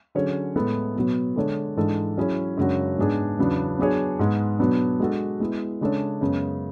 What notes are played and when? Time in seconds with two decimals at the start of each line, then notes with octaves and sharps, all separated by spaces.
0.15 D3 F#3 C#4 G#4 C#5
0.55 A2 G#3 B3 E4 A4
0.96 B2 F#3 B3
1.36 D3 G#3 D4 A4 C#5
1.77 G#2 E3 G#3 D4 A4
2.17 F#3 C#4 E4 G#4 C#5
2.57 F#2 C#3 G#3 D4 F#4
2.98 G#2 G#3 B3 D4 G#4
3.39 E2 C#3 F#3 B3 D4
3.78 F#3 B3 D4 G#4 C#5
4.19 G#2 G#3 B3
4.59 B2 F#3 B3 D4
5.00 G#3 D4 F#4 A4
5.40 G#3 B3 E4
5.81 C#3 G#3 D4 A4 C#5
6.21 F#2 C#3 G#3 B3